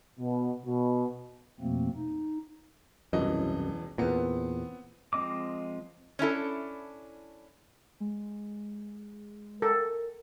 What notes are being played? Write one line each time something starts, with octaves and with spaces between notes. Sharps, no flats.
B2
B2
F2 B2 F3 A3 A#3 C4
D#4
E1 C2 F#2 E3 D#5
E2 A#2 B3 C4
F3 G#3 C4 D#5 D6
C#4 D4 E4 A4
G#3
A4 A#4